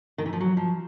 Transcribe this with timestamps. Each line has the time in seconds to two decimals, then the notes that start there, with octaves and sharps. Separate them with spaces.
0.18 D#3
0.26 E3
0.33 F3
0.40 F#3
0.57 F3